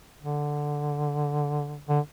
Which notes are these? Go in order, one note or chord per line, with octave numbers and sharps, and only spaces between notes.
D3
D3